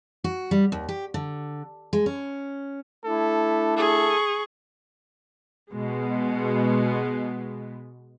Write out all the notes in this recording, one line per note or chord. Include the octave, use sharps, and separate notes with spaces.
F#4
G3
D#2
G4
D3
G#3
C#4
A3 D4 E4 A4
G#4 A4 C#6
B2 G#3 B3